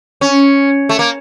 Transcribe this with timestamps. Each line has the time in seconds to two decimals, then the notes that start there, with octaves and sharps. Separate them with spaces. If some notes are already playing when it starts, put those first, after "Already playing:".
0.21 C#4
0.89 A3
0.99 A#3